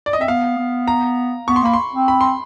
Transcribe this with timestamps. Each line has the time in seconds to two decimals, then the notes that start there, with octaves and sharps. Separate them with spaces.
0.06 D5
0.13 D#5
0.19 C4 E5
0.28 B3 F5
0.58 B3
0.88 A#5
1.48 B3 C#6
1.56 C6
1.63 A#3 B5
1.73 C6
1.93 C4
2.08 B5
2.21 C6